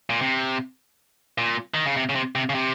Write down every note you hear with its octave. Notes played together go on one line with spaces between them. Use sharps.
A#2
C3
A#2
D#3
C#3
C3
C#3
C3
C3
C#3
C3